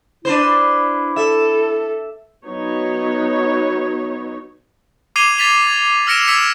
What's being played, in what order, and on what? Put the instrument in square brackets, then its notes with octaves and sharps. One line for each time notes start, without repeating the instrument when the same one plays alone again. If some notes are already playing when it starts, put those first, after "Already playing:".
[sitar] D4 B4 C5 [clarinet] E4
[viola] A4 [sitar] E5
[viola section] F#3 B3 D#4 C#5
[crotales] D6 G#6 C7 D#7 F7 G7
G#6 A6 B6 F7
G#6
E6 F6 A#6 C#7 D7 E7
D#6 E6 G#6 B6 C#7 E7